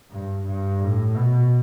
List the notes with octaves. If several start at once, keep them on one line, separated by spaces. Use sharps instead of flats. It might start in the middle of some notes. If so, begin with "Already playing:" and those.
G2
G2
A2
B2